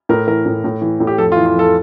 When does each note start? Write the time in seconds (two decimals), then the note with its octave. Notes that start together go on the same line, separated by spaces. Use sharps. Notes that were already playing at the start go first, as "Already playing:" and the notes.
0.09 A2 A#4
0.27 E3 A#4
0.46 A2
0.64 A2
0.82 E3
1.00 A2
1.07 G4
1.18 F2 A4
1.32 F4
1.36 E3
1.46 F4
1.55 F2 A4